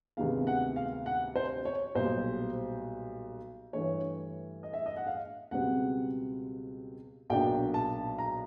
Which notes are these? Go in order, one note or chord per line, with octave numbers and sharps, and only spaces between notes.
D2 C3 D#3 G#3 B3 F5
F#5
F5
F#5
C5
C#5
B1 A#2 G3 C5
G2 E3 A3 C#5
D#5
E5
D#5
F#5
F5
C#2 B2 G3 C4 F#5
B1 A#2 F#3 A#3 D4 G5
A5
A#5